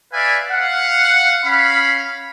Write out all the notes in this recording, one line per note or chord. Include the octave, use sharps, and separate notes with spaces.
B4 D5 E5 F5 G#5
F5 F#5
C#4 F5 B5